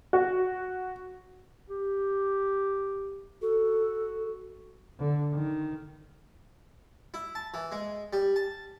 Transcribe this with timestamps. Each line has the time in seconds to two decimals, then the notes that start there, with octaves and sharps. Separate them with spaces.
0.13 F#4
1.70 G4
3.42 F#4 A4
4.99 D3
5.33 D#3
7.14 E4
7.35 A5
7.54 E3
7.72 G#3
8.13 G3
8.36 A5